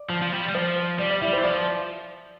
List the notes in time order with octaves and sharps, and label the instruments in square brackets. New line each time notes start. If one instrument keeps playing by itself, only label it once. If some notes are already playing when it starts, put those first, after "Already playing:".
Already playing: [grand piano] D5
[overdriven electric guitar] F3
F3
G3
G3
[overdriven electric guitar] F3 [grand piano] C5
[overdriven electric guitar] G3 [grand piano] D5
[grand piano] D5
[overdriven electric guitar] G3 [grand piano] E4 E5
[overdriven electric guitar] E3 [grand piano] C5
[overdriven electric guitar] F3 [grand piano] D5